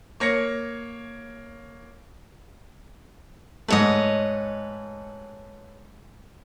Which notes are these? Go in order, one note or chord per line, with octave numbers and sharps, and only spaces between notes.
A#3 C#5 A#6 C#7
G#2 A3 B4 C#5 D#5